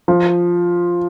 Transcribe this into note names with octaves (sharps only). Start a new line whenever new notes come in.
F3